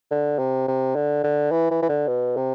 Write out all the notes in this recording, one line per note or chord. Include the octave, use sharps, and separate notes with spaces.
D3
C3
C3
D3
D3
E3
E3
E3
D3
B2
C3